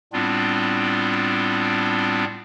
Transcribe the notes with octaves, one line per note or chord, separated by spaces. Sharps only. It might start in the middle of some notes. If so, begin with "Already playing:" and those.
A2 G3 B3 C4 D4 F4